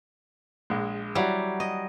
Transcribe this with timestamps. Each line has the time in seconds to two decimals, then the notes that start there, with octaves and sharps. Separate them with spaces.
0.70 A#1 G#3
1.15 F#3 G3 E4 F#4
1.60 D#5